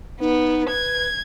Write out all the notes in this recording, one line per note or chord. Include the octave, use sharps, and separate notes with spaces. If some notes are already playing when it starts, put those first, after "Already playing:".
B3 D#4
B4 G#6